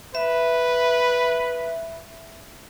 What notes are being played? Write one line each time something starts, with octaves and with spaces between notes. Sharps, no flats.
B4 E5